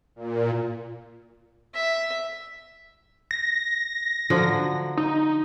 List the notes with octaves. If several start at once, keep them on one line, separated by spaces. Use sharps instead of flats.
A#2
E5
A#6
D3 F3 F#3
D#4